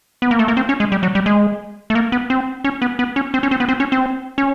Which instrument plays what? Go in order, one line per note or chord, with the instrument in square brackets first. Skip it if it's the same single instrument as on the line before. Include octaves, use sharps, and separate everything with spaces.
[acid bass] B3
A#3
A3
A#3
C4
C#4
G#3
G3
F#3
G3
G#3
A3
A#3
B3
C4
C#4
B3
B3
C#4
C4
C#4
C4
B3
C4
C#4
C4
C#4